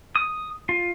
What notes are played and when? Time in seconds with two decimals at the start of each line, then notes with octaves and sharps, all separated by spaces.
0.16 D#6
0.69 F4